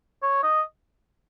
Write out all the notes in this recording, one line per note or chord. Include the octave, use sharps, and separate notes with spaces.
C#5
D#5